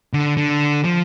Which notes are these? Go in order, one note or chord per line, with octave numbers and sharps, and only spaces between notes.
D3
D3
F3